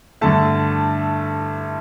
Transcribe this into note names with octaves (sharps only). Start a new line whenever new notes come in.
G2 D3 A3 A5